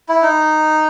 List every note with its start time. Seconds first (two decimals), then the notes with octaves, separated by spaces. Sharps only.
0.09 E4
0.22 D#4